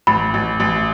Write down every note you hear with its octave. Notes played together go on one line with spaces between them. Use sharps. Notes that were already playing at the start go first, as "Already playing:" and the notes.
A1 B5
A1
A1